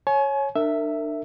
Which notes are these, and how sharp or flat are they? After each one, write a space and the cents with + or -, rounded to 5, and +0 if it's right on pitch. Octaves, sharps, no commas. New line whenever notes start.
C#5 -10 G#5 +35
D4 +35 A#4 -35 E5 +0